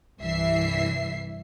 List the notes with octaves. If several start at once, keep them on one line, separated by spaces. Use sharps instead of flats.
C2 G2 E3 E5 C7